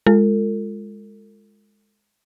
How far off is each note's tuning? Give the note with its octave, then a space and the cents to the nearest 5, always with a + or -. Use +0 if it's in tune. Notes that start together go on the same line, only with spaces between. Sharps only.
G#3 +0 F4 +0 A4 +40